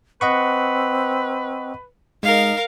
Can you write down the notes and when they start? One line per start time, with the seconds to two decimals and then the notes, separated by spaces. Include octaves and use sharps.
0.21 C4 B4 D#5 F#5 C#6
2.23 G#3 D#4 A#4 F5